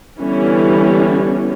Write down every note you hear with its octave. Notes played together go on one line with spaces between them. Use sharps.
D3 E3 G3 B3 C#4